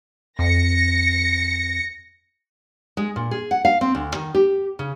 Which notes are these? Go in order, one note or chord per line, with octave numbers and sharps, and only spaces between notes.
F2 A#6 C#7
G#3
A#2
G#4
F#5
F5
C4
D2
D#3
G4
C#3